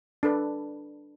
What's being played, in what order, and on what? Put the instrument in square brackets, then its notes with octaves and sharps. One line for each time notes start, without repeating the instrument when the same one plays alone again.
[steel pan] D4 A4 B4